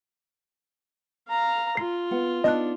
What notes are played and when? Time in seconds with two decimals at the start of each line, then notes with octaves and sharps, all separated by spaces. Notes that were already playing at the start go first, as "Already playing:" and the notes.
1.29 F5 A#5
1.77 F4 C7
2.11 B3 F#5
2.44 B3 D4 D#4 D#5 F#6